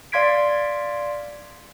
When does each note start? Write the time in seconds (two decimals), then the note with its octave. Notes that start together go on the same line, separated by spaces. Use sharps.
0.12 D5 F5 C6 G#6 B6 D7